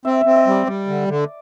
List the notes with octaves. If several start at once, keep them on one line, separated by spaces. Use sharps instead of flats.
C4 E5
C4 E5
E5
D#5
G3 D5
G3 D5
D3
D3